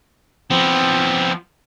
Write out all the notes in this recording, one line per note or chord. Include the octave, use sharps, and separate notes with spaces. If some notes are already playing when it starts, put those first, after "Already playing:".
F3 B3 C4